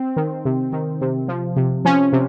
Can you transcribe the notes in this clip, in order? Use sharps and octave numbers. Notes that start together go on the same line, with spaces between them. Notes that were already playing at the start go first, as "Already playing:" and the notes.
Already playing: C4
D#3
C3
D#3
C3
F3
C3
F3 C#4
C3